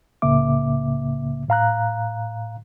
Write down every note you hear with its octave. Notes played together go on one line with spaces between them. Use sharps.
C2 A2 C#3 A#3 E5 D6
A2 F5 A#5 F#6